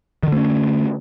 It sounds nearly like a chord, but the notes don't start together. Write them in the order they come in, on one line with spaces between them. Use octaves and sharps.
D#3 D3 A3 C#4